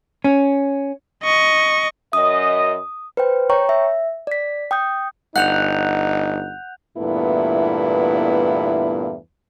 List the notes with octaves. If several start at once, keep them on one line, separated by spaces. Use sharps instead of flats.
C#4
D#5 C#6
F#2 D#5 D#6
B4 C5 G5
C#5 G5 A#5 C#6
E5
D5 B6
G5 D#6 G6
G1 D#4 F#5 F#6 G6 F7
E2 G2 A#2 A3 B3 E4